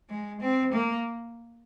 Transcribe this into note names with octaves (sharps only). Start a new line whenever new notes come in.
G#3
C4
A#3